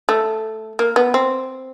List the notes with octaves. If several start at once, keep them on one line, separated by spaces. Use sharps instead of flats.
A3
A#3
B3
C4